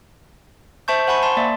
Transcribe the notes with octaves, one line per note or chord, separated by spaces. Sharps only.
C5 E5 A5 C#6 G6
C5 F#5 G#5 B5 C#6
A5 C6
A#3 D5 E5